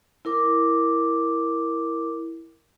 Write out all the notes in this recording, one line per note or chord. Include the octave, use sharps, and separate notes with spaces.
E4 A#4 D6